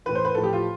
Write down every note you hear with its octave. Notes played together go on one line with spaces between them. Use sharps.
A2 E3 B4
C5
B4
A2 F3 A4
G4
F4